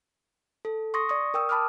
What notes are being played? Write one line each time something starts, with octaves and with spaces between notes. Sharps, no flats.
A4
C6 C#6 D#6 A#6
D5 C#6 D#6
A#4 G5 D#6 E6
A5 B5 D6 D#6 F6